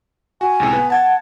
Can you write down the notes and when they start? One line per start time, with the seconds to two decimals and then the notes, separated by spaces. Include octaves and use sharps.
0.41 F#4 G#5
0.60 C#2 A2 C3
0.73 B3 B4
0.90 F#5 A5 G#6 A6